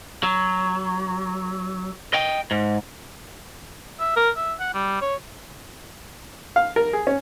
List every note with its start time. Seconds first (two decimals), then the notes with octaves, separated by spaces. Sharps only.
0.23 F#3
2.13 D#5 G5
2.51 G#2
4.00 E5
4.16 A#4
4.36 E5
4.60 F#5
4.74 G3
5.02 C#5
6.56 F5
6.76 A#4
6.93 G#4
7.07 C#4